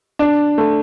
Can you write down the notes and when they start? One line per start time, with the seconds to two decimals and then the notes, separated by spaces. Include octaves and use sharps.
0.19 D4
0.58 A3